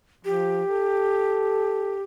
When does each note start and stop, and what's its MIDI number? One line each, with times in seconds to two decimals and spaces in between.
0.25 0.63 53
0.25 2.03 67
0.70 1.98 69